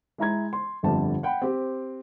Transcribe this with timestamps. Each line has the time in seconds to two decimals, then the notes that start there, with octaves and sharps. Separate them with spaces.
0.18 G#3 E4 A#5 G#6
0.53 C6
0.83 G1 F2 D3 G3 C4 A5
1.23 F#5 G5 B5
1.42 C4 G4